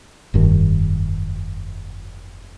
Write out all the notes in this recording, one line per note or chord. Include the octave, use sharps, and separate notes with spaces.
F1 G2 D#3